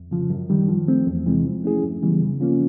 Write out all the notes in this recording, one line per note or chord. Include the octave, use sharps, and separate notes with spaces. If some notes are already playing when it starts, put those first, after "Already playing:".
Already playing: F2
C#3 F3
F#2
D#3 G3
F3
A3 C4
E2
C3 E3 G#3 C4
F3
A3 C#4 E4 G#4
F#2
C#3 E3 G3 B3
C#3
F3 A#3 C#4 F4